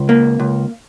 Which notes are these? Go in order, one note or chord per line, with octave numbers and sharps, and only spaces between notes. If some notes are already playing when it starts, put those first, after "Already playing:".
Already playing: C#2
A#3
C#2